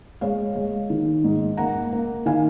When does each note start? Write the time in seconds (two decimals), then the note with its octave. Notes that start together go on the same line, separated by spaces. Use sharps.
0.21 G#3 C#5 F5
0.56 G#3
0.90 D#3
1.24 G#2
1.57 A#3 F#5 A#5
1.93 A#3
2.26 D#3 F5 G#5